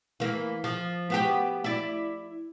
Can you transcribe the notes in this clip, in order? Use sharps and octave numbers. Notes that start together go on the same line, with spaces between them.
E3 A#3
F3
B3 F#4 G4
E4 D5